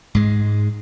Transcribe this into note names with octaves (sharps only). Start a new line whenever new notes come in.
G#2 G#3